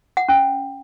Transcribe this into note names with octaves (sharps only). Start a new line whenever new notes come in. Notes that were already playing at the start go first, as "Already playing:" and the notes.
F#5
C#4